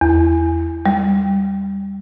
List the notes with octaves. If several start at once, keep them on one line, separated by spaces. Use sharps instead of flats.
E2
G3